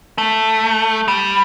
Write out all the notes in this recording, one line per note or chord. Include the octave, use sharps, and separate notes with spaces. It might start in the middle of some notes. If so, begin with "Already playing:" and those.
A3
G3